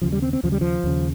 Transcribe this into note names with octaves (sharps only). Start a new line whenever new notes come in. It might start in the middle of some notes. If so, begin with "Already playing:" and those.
D#2 C#3 F3
G3
C4
C4
D#2 C#3 F3
G3
F3
D#2 C#3